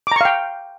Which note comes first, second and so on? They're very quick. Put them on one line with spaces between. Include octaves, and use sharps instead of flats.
D6 A#5 C#6 F5 G5